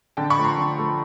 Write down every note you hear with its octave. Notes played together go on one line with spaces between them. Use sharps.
D3 G5 A5
B5 C#6
F3 A3
A#5 C6
D3
F3 A3